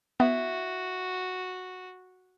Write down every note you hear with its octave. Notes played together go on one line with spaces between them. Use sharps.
B3 E4 F#4